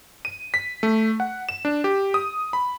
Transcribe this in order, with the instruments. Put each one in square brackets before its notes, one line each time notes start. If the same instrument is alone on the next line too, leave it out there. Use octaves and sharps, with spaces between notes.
[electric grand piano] D#7
B6
A3
F#5
E7
D4
G4
D#6
B5